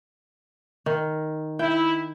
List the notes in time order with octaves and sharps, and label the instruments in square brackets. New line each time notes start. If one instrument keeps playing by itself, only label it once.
[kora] D#3
[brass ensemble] E4 [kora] G5